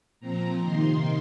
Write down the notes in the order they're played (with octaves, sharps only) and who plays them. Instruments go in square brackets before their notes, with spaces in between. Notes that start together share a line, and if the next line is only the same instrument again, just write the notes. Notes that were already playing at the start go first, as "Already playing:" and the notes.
[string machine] A#2 F3 C4 A#5
C3 D#3 A#3 D#4 C6